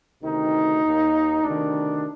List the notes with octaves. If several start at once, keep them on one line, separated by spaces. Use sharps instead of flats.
D2 C3 D#3 D#4
D#2 D#3
D2 C3 D#3 D4